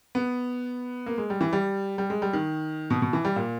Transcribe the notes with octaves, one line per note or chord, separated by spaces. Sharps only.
B3
A#3
G#3
G3
E3
G3
G3
G#3
G3
D#3
B2
B2
E3
G3
A#2